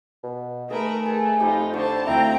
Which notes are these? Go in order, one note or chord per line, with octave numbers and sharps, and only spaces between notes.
B2
D#3 A3 G#4 A#4 B4
G#4 A4 G#5
F2 D#4 F4 G4 B5
D3 C5 A5 C#6
D2 C4 E4 E5 F5 G5 A#5